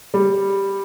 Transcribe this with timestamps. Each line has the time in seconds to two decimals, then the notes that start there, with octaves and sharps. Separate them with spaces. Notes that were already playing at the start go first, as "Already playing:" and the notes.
0.14 G3